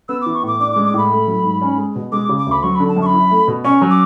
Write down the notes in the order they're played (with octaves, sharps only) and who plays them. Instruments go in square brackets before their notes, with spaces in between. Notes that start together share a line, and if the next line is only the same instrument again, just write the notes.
[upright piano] B3 [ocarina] E6
[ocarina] D6
[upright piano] E3
[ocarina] C#6
[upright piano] A2 [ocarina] D6
[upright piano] D4 [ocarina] D6
[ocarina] D6
[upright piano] G#3
[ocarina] D6
[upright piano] A2 [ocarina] B5
[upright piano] A3
F#3
G#2
C#4
G#3
B2
[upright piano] G#3 [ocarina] D6
[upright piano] C#3
[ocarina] D6
[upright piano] D2
[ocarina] B5
[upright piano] F#3 [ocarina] C#6
[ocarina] B5
[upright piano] D3
[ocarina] A5
[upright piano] F#2
[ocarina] C#6
B5
[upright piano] E4
A3
B2
[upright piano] C#4 [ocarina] C#6
[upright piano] F#3
[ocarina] D6